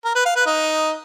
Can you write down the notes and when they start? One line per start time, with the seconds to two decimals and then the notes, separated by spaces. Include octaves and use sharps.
0.05 A#4
0.15 B4
0.26 F5
0.36 B4
0.46 D#4